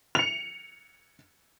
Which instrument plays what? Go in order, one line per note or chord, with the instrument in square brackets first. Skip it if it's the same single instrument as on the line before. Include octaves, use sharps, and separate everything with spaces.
[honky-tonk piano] C#7 F7